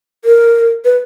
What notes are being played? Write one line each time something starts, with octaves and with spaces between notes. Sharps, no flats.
A#4
B4